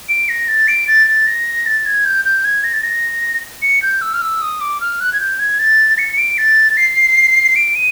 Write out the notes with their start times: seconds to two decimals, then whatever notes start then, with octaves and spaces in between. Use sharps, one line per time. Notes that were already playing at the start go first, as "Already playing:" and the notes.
0.09 D7
0.29 A#6
0.48 A6
0.68 D7
0.88 A6
1.07 A6
1.27 A#6
1.66 A6
1.86 G#6
2.05 G6
2.25 G6
2.45 G#6
2.64 A#6
2.74 A6
2.83 A#6
3.62 C#7
3.82 G6
4.02 E6
4.14 F6
4.21 E6
4.42 D#6
4.61 D6
4.81 F6
5.00 F#6
5.13 G#6
5.20 G6
5.39 G#6
5.59 A6
5.98 C#7
6.13 C#7
6.18 D7
6.38 A6
6.77 C7
7.56 D7
7.76 D#7